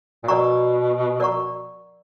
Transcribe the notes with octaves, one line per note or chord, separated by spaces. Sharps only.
A#2
B2 A#4 D5 F#5 A#5 C#6
A#4 D5 F#5 A#5 C#6